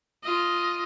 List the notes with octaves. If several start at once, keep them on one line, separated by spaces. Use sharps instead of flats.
F4 D#5